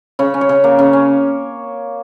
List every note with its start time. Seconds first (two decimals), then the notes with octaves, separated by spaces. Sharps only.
0.19 C#3 C#5
0.34 C#4
0.41 C#5
0.49 C#3
0.64 A#3
0.79 C#3
0.93 C#4